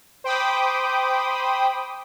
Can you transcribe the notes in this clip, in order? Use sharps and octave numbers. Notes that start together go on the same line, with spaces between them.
C5 G5 B5 D6 D#6